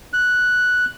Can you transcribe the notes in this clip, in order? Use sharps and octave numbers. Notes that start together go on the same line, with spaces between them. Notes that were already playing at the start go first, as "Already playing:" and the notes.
F#6